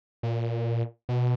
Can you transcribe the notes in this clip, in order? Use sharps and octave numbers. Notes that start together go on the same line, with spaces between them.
A#2
B2